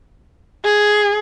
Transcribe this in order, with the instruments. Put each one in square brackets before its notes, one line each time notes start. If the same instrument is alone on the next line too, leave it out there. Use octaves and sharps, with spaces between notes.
[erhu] G#4